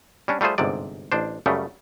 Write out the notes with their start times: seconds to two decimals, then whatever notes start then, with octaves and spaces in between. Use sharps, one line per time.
0.28 G3 C#4 D4
0.41 G3 A3 F4 G#4 C5
0.58 G1 G#2 C3 D5
1.12 A1 D4 C5
1.46 F#2 C#3 G3 A3